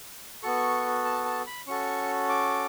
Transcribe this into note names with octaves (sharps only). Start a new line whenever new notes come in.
B3 F#4 A4 C#6
A5
A5
B5
C#4 F#4 A4 C#6
D6